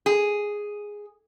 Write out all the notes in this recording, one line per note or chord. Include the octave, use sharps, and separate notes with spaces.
G#4